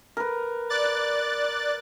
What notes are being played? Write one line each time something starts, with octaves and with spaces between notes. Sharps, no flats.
A#4 B4
D5 F#6 A6